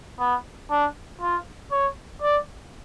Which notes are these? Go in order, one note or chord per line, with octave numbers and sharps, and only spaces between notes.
B3
D4
F4
C#5
D5